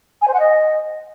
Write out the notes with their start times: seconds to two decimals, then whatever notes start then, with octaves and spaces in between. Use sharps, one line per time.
0.21 G#5
0.28 C5
0.34 F#5
0.40 D#5